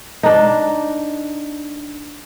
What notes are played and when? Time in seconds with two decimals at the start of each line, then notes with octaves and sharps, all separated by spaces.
0.23 D4 D#4